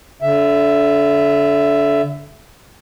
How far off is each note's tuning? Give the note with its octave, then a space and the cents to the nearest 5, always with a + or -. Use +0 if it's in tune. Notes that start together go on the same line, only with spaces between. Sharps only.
D3 -30 E5 +10